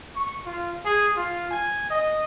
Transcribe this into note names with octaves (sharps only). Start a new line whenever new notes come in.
C#6
F4
G#4
F4
G#5
D#5